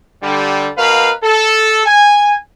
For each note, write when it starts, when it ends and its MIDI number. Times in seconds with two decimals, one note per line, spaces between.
0.23 0.69 50
0.23 0.69 55
0.77 1.10 47
0.77 1.10 70
0.77 1.10 71
0.77 1.10 77
1.23 1.81 69
1.86 2.33 80